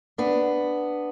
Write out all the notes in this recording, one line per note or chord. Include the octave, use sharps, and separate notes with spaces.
B3 D4